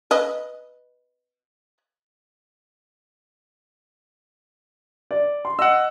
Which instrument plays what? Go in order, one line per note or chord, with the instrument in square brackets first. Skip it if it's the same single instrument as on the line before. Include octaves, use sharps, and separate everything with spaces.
[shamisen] B4 D#5
[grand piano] D5
C6
[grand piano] D#5 [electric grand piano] F#5 E6